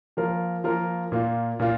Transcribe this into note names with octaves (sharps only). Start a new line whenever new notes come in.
F3 A#3 F4 A#4
F3 A#3 F4 A#4
A#2 A#3 F4
A#2 A#3 F4